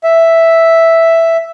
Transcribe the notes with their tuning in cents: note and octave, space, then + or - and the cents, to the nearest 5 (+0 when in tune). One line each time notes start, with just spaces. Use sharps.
E5 +0